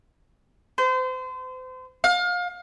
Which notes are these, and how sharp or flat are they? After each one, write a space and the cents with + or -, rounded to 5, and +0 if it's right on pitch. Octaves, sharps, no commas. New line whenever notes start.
C5 -35
F5 +30